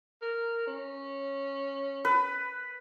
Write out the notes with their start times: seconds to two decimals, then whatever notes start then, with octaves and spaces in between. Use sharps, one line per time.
0.22 A#4
0.67 C#4
2.05 B4